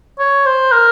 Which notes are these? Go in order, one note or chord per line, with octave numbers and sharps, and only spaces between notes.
C#5
C5
A#4